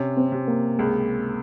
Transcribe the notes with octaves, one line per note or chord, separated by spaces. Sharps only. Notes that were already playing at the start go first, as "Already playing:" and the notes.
Already playing: C3 C#4
C4
C3
A#3
C#2 G#3